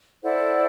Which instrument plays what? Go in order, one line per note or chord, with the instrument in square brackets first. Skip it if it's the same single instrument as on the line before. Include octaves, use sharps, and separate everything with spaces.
[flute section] E4 A4 C5 D5 F#5